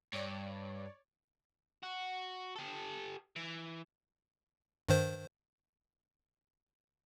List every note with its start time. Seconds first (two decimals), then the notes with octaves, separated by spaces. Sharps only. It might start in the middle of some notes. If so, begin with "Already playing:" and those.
0.13 G2 C#5 D5
1.83 F#4
2.56 G4 A4
3.36 E3
4.89 G2 D#3 C5